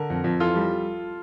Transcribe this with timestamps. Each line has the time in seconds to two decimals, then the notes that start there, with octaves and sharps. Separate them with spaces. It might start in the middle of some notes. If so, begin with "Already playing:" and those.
Already playing: D3 A#4
0.10 F2
0.24 F2
0.40 E3 F4 A4
0.56 G3